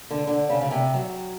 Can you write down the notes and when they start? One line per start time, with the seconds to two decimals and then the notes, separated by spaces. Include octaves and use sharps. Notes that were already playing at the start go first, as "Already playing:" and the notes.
0.10 D3
0.27 D3
0.50 C#3
0.61 C#3
0.71 C3
0.94 F#3